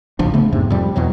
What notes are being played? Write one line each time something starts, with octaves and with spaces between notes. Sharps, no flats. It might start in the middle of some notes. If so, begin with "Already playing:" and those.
G#1 C#2 F3 D4
C#3 A3 B3
F2 G#2 C3
F2 G3
E2 B2 F#3